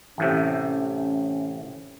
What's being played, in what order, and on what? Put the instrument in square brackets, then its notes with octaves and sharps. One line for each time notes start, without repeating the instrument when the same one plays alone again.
[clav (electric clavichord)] A1 A2 C3 [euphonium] C#4